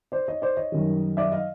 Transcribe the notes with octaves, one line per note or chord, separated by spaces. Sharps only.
C5 D5
C#5 D#5
C5 D5
C#5 D#5
F#2 D#3 G3
D5 E5
D#5 F5